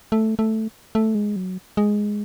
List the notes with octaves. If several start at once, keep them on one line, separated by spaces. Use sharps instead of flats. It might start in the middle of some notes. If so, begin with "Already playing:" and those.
A3
A3
A3
G#3
F#3
G#3